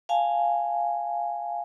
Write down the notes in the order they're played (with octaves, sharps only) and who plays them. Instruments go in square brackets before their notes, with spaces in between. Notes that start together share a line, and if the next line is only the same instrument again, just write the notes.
[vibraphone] F5 G#5 A5